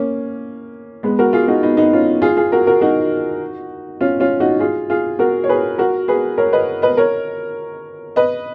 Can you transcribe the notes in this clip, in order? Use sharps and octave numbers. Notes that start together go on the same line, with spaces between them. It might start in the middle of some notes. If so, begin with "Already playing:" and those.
Already playing: A#3 C#4
G#3 B3
F#4 A#4
F4 G#4
D#4 F#4
B3 D#4
B3 D#4
C#4 F4
F4 G#4
F4 G#4
F#4 A#4
F#4 A#4
D#4 F#4
C#4 F4
C#4 F4
D#4 F#4
F4 G#4
F4 G#4
F#4 A#4
C#5
G#4 B4
F#4 A#4
G#4 B4
A#4 C#5
B4 D#5
B4 D#5
A#4 C#5
B4 D#5